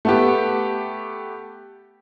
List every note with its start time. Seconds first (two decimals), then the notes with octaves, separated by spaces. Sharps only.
0.05 A3 B3 G4